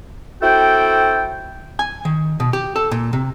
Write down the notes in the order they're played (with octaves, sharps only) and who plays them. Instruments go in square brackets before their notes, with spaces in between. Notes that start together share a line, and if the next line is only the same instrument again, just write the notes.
[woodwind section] C4 E4 F#4 A4 G5
[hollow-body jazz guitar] G#5
D#3
B2
G4
A4
A#2
C3